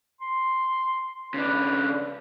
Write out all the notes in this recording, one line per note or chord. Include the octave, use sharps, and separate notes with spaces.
C6
C#3 D4 B4